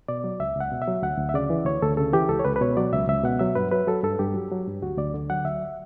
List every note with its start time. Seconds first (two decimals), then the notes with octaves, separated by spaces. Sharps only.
0.08 B2 D5
0.24 F#3
0.40 C#2 E5
0.56 C#2 F#5
0.72 B2
0.82 E5
0.88 F#3
1.02 D2 F#5
1.18 D2
1.29 E5
1.34 C#3 D5
1.50 E3
1.66 D2 C#5
1.82 D2 A4
1.97 C#3 A4
2.13 E3 G4
2.29 C#2 A4
2.39 C#5
2.45 C#2 B4
2.56 B4
2.61 B2 C#5
2.77 F#3 D5
2.93 C#2 E5
3.08 C#2 E5
3.24 B2 F#5
3.39 F#3 E5
3.55 G2 B4
3.72 F#3 B4
3.87 F#3 A4
4.03 G2 A4
4.19 G2 G4
4.34 F#3
4.51 F#3
4.67 G2
4.82 D2 F#4
4.98 D2 D5
5.14 D3
5.30 F#3 F#5
5.45 D2 E5